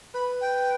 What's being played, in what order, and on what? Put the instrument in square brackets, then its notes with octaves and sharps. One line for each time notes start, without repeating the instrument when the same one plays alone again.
[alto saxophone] B4 [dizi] B5
[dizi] G5